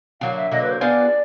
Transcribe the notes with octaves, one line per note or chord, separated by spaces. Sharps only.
D3 F#3 A#3 F5
E5
D3 F#3 A#3 D#5
B4
C5
B3 D4 F4 G#4 D5